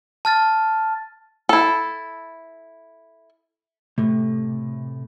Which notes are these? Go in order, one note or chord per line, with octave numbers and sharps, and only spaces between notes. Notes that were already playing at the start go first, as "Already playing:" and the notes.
A5 F6 A6
E4 A4
A2 C3 A3